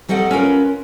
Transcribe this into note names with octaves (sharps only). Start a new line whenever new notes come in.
F#3 G3 C4 A4 D#5 F#5
C#4 F4 A#4 B4